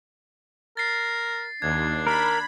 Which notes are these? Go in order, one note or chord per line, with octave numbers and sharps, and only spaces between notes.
A#4 A6 C7
D#2 D4 G#6
A#4 B5